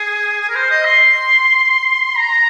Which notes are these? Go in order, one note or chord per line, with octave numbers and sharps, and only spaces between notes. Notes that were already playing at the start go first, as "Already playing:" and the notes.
Already playing: G#4
G#4
A#4
C5
D#5
C6
A#5